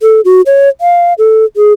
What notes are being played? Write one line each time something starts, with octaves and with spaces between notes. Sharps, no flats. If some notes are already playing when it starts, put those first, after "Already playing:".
A4
F#4
C#5
F5
A4
G#4